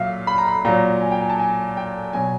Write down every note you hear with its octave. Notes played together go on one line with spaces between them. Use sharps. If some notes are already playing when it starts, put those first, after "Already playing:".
Already playing: A#2 F#3 E5 F5
B5
A#5
B5
A#2 F#3 A#5
G#5
G5
G#5
A5
G#5
G5
B2 F#3 G#5